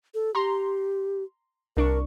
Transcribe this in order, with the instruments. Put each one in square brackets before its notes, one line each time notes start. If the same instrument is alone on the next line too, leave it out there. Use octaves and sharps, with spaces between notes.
[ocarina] A4
[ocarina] G4 [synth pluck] A#5 C6
[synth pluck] C2 D4 C#6 [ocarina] A#4